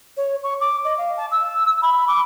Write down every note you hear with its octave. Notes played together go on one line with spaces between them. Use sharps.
C#5
C#6
D6
D#5
F5
A5
E6
B5
D6